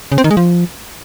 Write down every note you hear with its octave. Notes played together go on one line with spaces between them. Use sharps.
C#3
C4
D#3
G#3
F3